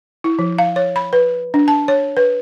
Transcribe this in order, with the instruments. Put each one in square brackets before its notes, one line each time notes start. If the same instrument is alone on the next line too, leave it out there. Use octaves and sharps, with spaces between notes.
[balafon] E4
F3
F5
C#5
B5
B4
D4
A5
C#5
B4